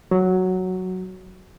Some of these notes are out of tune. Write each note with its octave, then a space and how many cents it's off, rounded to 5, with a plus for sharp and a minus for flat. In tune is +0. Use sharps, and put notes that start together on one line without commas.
F#3 +0